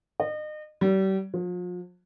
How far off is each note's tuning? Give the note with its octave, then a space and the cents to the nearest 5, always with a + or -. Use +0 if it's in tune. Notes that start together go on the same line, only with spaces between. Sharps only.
D#5 -35
G3 -35
F3 +40